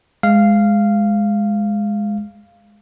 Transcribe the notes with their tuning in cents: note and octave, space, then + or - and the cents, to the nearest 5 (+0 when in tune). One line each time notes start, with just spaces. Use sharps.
G#3 +0 F5 -10